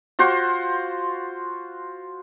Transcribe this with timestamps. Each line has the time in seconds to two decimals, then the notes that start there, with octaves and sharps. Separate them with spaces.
0.19 F4 F#4 C5 C6